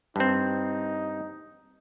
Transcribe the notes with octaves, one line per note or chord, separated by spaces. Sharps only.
G2 C4 D#4